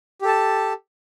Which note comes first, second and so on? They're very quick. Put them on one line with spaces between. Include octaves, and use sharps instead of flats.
G4 A4 A5